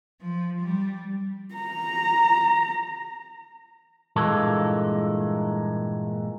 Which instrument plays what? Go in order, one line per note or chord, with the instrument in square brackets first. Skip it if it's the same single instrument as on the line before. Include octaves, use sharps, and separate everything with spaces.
[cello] F3
G3
[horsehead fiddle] A#5
[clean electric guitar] G2 A#2 E3 G#3 A#3 A4